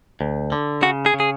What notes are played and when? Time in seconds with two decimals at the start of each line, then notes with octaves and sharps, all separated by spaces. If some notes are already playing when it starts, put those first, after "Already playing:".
0.21 D2
0.52 D3
0.82 C#3 F#4
1.06 G#4
1.14 C#3
1.20 G#4